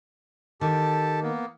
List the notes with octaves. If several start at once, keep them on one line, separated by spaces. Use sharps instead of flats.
D#3 G4 A4 A5
A#3 B3